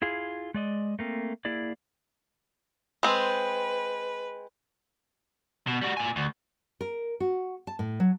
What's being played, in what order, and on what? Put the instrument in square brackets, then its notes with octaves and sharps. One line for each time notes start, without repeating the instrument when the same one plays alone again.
[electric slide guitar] E4 F4 G#4
G#3 D5 D#5
A3 A#3 C4
A#3 E4 G#4 D5
[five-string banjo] G#3 C4 [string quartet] B4
[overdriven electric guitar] B2
G3 F#4
A#2 G#5
D2
[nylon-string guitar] A#4
F#4
A5
A2
F#3